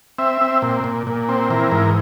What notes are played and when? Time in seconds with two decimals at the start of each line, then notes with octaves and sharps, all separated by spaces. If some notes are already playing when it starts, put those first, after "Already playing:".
0.19 C4 E5
0.41 C4
0.62 A#2
0.84 A#2
1.07 A#2
1.29 C4
1.50 E3 A#4
1.71 G#2